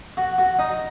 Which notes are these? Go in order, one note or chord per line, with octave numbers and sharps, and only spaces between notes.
F#4
F#4
D#4